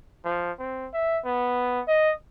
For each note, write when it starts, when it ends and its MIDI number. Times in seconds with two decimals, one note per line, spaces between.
0.25 0.52 53
0.59 0.88 60
0.93 1.19 76
1.25 1.81 59
1.88 2.14 75